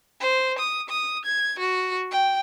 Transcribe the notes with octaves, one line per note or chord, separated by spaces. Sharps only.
C5
D#6
D#6
G#6
F#4
G5